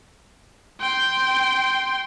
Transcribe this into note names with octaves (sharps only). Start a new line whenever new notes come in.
G5 C6